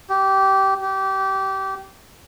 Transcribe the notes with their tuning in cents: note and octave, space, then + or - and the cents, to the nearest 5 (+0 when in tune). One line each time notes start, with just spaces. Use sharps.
G4 -20
G4 -25